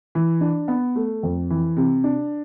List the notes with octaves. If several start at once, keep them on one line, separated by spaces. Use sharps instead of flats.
E3
D4
B3
A3
F2
E3
C3
D4